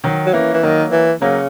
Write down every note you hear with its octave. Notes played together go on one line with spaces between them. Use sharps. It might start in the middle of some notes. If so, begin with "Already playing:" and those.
D#3 F#3
F#3
E3 A#3 C#4
E3
D#3 F#3 A#3
E3
C#3 F#3 A#3